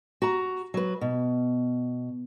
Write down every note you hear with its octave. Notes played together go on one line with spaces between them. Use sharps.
F#4 A#5
F#3 B4
B2